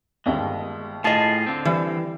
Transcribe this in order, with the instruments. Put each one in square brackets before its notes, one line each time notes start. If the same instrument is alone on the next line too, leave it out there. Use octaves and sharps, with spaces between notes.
[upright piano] G1 D#2 E5 [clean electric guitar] G#3
[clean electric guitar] A2 F4 G#4 [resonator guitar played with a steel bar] D#5 A5
[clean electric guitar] D3 C4
[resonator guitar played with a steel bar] E3 [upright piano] G3